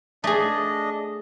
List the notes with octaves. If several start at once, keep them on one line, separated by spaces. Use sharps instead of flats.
A3 D4 G#4 D#5